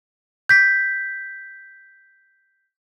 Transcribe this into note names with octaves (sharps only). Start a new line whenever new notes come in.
G6 B6